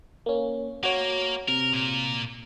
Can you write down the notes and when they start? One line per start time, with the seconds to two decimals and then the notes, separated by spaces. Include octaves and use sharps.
0.26 A#3 C#4
0.83 A#3 F#4 C#5
1.48 C3 A#4
1.73 A#2 A#4